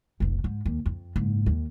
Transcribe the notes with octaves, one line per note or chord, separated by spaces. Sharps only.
F1 B1
G#2
D#2
F2
F#1 G#2
D#2